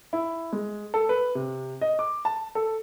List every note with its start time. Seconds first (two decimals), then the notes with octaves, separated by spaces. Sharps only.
0.13 E4
0.52 G#3
0.94 A4
1.09 B4
1.35 C3
1.81 D#5
1.99 D6
2.25 A5
2.55 A4